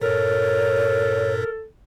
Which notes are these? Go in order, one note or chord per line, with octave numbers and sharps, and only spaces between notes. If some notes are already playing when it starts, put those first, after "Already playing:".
G2 A#2 A4 A#4 C#5